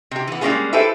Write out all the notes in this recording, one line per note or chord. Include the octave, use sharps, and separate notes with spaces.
C3 G4
E3 B3
G3 G#3 A#3 C#4 F4 G#4
E4 G4 A4 B4 C5 E5